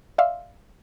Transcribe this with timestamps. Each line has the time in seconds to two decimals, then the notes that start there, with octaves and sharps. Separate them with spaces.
0.18 D5 E5 F5 C6